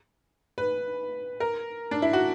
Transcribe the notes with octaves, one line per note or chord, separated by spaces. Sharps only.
B4
A#4
D4
E4
F#4